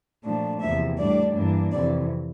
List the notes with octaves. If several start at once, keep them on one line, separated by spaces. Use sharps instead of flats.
A#2 F3 A3 D4
E2 C3 F3 A#3 E5
A2 G3 D4 D5
G2 E3 A#3 D4
F2 C3 E3 D5